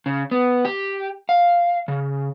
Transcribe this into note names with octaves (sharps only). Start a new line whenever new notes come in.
C#3
B3
G4
F5
C#3